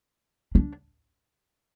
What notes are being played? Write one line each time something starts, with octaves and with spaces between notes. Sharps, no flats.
D4